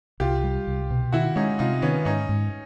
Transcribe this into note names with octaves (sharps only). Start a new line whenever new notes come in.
C2 F4 G4
G3
C2
B2
D#3 E4 F#4
G#3 C#4 D#4
C3 D#4 F4
D#3 B3 C#4
G#2 C#4 D#4
G#2